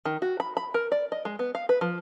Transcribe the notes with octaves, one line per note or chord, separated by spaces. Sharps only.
D#3
F#4
B5
B5
A#4
D5
D#5
G#3
B3
F5
B4
F3